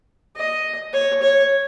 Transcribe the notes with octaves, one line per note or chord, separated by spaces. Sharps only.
D#5
C#5
C#5